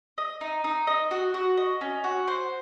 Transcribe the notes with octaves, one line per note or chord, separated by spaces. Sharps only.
D#5
D#4
D#4
D#5
F#4
F#4
D#5
C#4
F#4
C5